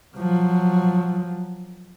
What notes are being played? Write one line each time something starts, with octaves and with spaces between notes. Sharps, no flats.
F3 F#3